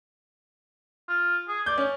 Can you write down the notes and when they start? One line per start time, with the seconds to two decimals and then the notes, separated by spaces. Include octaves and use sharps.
1.09 F4
1.48 G#4
1.66 D5 G6
1.78 C#4